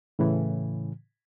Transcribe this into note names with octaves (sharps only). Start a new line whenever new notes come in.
A2 C#3 E3